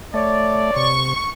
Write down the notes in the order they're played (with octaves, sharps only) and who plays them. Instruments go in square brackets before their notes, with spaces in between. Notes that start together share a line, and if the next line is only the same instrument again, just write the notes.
[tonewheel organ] A3 [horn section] C#5 D5
[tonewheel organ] C3 [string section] C#6